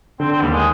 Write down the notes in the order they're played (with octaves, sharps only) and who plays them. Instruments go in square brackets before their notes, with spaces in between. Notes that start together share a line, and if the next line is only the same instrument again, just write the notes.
[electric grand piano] D3 [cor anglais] C4
[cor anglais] C4
[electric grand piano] D#2 [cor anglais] G3
[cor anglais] G#3